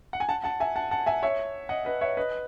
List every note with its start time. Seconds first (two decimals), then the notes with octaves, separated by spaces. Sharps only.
0.13 F#5
0.20 G#5
0.29 F#5 A5
0.44 F#5 A5
0.60 E5 G#5
0.76 F#5 A5
0.91 F#5 A5
1.06 E5 G#5
1.23 C#5 E5
1.69 D#5 F#5
1.85 B4 D#5
2.01 C#5 E5
2.17 B4 D#5